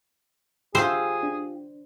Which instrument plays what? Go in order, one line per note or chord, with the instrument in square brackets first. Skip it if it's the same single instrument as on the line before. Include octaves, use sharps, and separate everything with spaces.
[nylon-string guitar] F4 G4 [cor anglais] G#4 [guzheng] C5 [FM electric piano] G#5 E6
[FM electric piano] D4